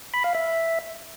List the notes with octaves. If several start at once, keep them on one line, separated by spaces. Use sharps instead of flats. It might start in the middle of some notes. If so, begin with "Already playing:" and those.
B5
F5
E5